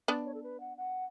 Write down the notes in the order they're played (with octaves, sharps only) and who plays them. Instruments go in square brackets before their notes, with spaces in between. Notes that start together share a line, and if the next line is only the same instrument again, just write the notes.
[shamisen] B3 D4
[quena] C#5
A4
B4
F#5
F#5